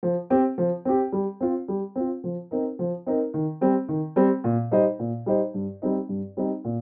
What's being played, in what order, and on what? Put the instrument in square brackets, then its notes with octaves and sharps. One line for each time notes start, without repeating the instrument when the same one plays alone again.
[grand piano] F3
C4 G4
F3
C4 G4
G3
C4 F4
G3
C4 F4
F3
C4 D#4 A#4
F3
C4 D#4 A#4
D#3
G3 C4
D#3
G3 C4
A#2
G3 D#4 C5 D#5
A#2
G3 D#4 C5 D#5
G2
G3 C4 D#4
G2
G3 C4 D#4
A#2